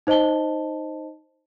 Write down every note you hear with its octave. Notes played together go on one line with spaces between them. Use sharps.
D#4 C5 D#5 A5 G7